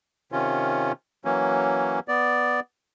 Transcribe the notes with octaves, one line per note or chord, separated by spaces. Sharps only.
C3 D#3 C#4 F4
E3 F#3 A#3 C#4
B3 D5